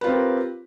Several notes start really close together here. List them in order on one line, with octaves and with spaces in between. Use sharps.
B4 F4 C4 G4 A#4